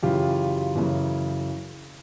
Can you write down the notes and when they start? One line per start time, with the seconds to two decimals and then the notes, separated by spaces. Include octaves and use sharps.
0.03 F#2 C#3 E3 F4 G4
0.75 F#2 C#3 E3